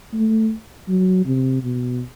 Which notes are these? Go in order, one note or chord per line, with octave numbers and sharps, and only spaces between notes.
A3
F#3
C3
B2